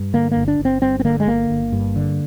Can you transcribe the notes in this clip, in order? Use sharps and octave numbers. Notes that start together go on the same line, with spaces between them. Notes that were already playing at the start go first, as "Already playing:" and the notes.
Already playing: G2
D3 A#3
A#3
G1
D4
G1
C4
G2 C4
C4
D3 A#3
G#3
G1 A#3
G1
G2
D3